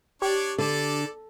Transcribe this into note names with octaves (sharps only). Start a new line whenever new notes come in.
D4 G4 C#5 D5
D3 A4 D5